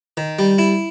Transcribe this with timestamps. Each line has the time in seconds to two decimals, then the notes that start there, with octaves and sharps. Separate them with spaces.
0.17 D#3
0.39 G3
0.58 E4